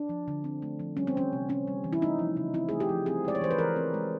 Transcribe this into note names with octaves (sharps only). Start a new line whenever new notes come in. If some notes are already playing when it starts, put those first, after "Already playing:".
Already playing: D4
F3
D3
C4
A3
F3
G3 C#4
C4
E3 C#4
C3
C4 C#4
G3
E3
E4
A3 D#4
F3
C#3
C4 E4
A3 G#4
G4
F3
C4 G#4
G#3 D5
C#5
E3 C5
B4
E3 A#4
C4
G#3